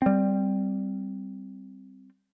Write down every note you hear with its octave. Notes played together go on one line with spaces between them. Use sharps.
G3 C4